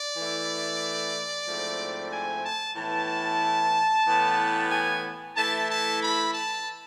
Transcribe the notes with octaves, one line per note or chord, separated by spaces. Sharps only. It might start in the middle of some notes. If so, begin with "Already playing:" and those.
Already playing: D5
E3 A3 E4
G#2 F3 A3 C4 E4
G#5
A5
A2 E3 B3 E4 A5
A2 E3 B3
G#5
E3 A3 E4 A5
A5
B5
A5